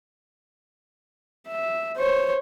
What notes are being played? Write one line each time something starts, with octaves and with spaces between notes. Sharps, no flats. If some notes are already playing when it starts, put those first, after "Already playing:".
E5
C5 C#5